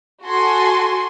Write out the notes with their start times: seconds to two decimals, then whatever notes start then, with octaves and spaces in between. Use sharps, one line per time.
0.25 F#4 A4 G#5 C6